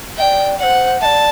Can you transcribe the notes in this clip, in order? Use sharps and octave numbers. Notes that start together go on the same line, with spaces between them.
D5 E5 G5
C5 D5 F#5
D5 E5 A5